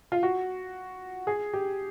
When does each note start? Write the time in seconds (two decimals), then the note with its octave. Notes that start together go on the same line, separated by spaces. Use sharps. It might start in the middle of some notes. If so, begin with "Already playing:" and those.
0.12 F4
0.23 F#4
1.27 G#4
1.53 G4